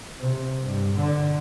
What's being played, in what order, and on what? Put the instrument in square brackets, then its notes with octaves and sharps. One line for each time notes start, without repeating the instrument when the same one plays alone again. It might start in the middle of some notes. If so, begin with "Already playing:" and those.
[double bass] C3
G2
D3